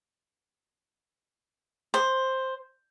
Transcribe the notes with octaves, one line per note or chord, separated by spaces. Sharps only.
C5